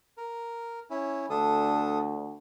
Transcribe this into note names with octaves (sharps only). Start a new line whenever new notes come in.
A#4
C#4 E4
D2 D4 A4 D#6